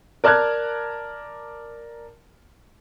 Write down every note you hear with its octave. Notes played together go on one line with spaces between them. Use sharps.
A#4 D5 A5 F6 F#6 G#6